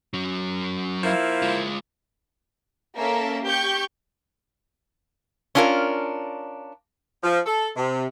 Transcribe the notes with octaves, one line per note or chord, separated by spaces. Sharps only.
F#3 C#4
F3 A#3 E4
G#3 F4
A#3 C#4 A4 A#4 E5
G4 C#6 G6
C#4 D4 F4 F#4 A#4
F3
A4
C3